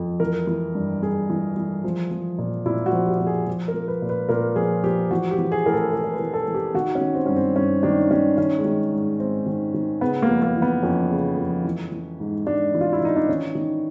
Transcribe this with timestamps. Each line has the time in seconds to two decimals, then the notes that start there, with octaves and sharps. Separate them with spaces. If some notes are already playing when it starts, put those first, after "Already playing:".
Already playing: F2
0.20 E3 A#4
0.47 E3
0.75 G2
1.02 G2 G#4
1.30 E3
1.56 E3
1.84 F3
2.11 F3
2.38 A#2
2.66 A#2 E4
2.86 F#4
2.93 F3
3.07 G4
3.20 F3
3.27 G#4
3.47 F3
3.68 A#4
3.74 F3
3.88 B4
4.02 A#2
4.09 B4
4.29 A#2 A#4
4.56 F3 G#4
4.84 F3 G4
5.11 E3 F#4
5.31 G4
5.38 E3
5.52 G#4
5.66 A2 A#4
5.72 A4
5.93 A2 A#4
6.03 A#4
6.13 B4
6.20 E3
6.34 A4
6.48 E3
6.54 G4
6.74 D#3 F#4
6.95 C#4
7.01 D#3
7.15 C4
7.26 G2 C#4
7.36 C4
7.56 G2 C#4
7.83 D#3 D4
8.11 D#3 C#4
8.38 D#3 C#4
8.58 G#3
8.65 D#3
8.92 G#2
9.20 G#2 C4
9.46 D#3
9.74 D#3
10.01 C#3 B3
10.22 A#3
10.29 F2
10.42 A#3
10.55 E3
10.62 B3
10.83 F2 C#4
11.10 C#3
11.37 F2
11.65 E3
11.92 E3
12.20 G#2
12.47 G#2 D4
12.74 E3
12.81 F4
12.93 E4
13.01 E3 D#4
13.17 D4
13.29 D#3 C#4
13.55 D#3